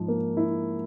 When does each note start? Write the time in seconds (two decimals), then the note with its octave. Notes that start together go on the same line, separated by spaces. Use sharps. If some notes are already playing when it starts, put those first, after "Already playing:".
Already playing: G#2 F3
0.08 A#3
0.37 E4